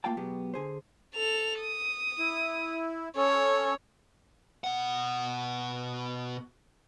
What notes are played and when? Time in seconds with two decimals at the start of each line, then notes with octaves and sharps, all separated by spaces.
0.04 A3 A#3 F4 F5 G5 A5
0.17 B2 F#3 G#3 B3 G4
0.54 D3 G#4 C5
1.15 A4 F7
1.61 D#6
2.19 E4
3.16 C#4 A4 C#5
4.64 B2 F#5